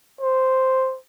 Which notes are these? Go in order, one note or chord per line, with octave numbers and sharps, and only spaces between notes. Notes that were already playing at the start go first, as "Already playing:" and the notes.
C5